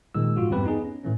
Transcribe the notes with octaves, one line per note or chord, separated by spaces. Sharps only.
A#2 D#3 G#3 E6
G#2 F3 F4 F#4
E2 G2 G3 C4 G4 B4
B3 D#4 G#4
C#4
A2 E3 A3 C#4